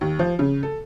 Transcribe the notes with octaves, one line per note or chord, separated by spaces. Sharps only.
D#2
F3
C#3
A4